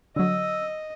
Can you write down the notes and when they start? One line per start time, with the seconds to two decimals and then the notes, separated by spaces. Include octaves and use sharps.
0.16 D3 F#3 D#5 E6